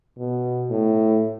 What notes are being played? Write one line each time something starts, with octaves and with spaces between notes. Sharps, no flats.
B2
A2